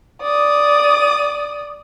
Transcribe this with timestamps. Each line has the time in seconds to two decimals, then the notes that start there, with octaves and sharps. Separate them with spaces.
0.22 D5 D#6